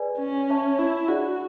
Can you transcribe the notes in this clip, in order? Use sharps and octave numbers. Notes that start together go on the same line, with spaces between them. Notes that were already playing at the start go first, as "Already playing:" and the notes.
Already playing: G#4 B4 D5 G#5
C#4
C#5 E5 A5 C#6
E4
D4 F#4 G#4 D5